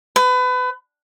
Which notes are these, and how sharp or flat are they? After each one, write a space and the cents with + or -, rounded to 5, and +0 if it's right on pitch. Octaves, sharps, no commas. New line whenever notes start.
B4 +30